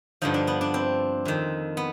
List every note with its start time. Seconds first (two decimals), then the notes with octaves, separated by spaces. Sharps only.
0.22 G2 D3 F3 D#4
0.34 D4
0.47 B3
0.61 D4
0.74 C4
1.25 F2 D#3
1.77 B3